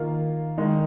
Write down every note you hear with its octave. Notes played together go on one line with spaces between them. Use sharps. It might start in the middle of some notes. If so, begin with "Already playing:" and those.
Already playing: D#3 A#3 F4 A#4
D#3 G#3 D#4